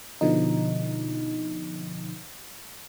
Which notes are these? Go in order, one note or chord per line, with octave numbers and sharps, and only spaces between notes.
B2 D3 F3 D#4